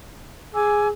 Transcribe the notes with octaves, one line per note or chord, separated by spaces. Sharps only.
G#4 G#5 D6 E6